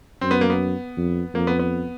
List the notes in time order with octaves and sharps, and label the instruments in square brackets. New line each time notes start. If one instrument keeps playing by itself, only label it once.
[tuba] F#2 [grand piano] C4
[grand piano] B3
A#3
B3
[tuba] F2
[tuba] F2 [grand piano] A#3
[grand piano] B3
B3